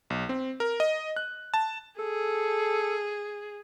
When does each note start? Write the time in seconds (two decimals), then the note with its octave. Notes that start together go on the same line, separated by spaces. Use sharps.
0.10 B1
0.29 C4
0.60 A#4
0.80 D#5
1.16 F#6
1.54 A5
1.99 G#4 A4